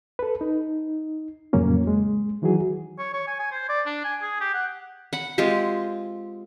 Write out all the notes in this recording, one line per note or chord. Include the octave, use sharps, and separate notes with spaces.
A4 B4
D#4
F2 A2 C#3 F#3 A#3 C#4
G#3
D#3 E3 F#3 F#4 G#4
C#5
C#5
G#5
G#5
C5
D5
D4
G#5
G#4
G4
F#5
F#5 B5
G#3 C4 F4 G4